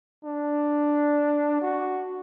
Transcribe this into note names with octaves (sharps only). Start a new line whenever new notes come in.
D4
F#4